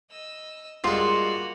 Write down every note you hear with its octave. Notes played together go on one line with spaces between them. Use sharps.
D#5 E6
G2 G#3 A#3 F4 F#4